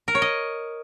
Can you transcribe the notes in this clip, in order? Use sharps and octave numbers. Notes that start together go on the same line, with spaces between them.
A#4
C#5
D#5